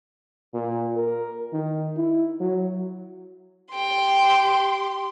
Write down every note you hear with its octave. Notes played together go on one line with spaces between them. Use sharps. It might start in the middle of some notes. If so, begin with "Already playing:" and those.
A#2
A#4
D#3
E4
F#3
G4 G5 C6